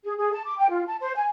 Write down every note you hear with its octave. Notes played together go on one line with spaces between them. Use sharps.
G#4
G#4
A5
D6
G5
F4
A5
C5
G#5